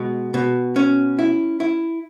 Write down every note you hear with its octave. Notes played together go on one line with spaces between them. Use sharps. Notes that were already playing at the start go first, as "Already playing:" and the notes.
Already playing: B2 G#3
B2
C#4
E4
E4